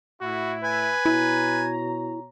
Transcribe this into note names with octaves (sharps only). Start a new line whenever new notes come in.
A2 E4 F#4
B4 G#5
B2 E4 C#5 A#5